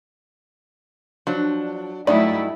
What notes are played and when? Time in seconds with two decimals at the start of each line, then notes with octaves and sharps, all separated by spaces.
1.27 F3 F#3 D4
2.07 G2 F#3 A3 D#4 E4 D5